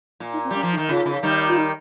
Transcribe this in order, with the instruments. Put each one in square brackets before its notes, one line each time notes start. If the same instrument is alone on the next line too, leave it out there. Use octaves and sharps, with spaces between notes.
[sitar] A#2
[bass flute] D#4
C4
[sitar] G3 [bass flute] C#4
[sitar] F3
[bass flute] D#4
[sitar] D#3
[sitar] C#3 [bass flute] F4
[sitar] C#3
D#3 G3
[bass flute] F4
D#4